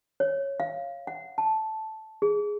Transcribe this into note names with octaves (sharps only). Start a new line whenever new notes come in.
C#5
F5
F#5
A5
G#4